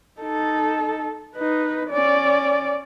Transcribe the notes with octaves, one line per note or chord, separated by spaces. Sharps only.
D#4 A4
D#4 B4
C#4 D5